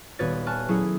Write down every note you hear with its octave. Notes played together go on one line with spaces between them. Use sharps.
D#1 B3 F#4 B4 C#5 A6
G#5 A5 C#6 F6 F#6 A6
F#3 C#4 E4 G#4 A4 C#5